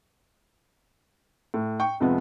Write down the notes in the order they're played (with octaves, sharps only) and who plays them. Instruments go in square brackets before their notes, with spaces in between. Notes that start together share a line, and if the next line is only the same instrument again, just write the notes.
[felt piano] A2
G5 C#6
F2 C3 F3 G#3 B3